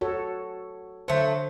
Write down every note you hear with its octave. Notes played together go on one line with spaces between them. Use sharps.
F#4 A4 C#5
D3 F#3 A3 C5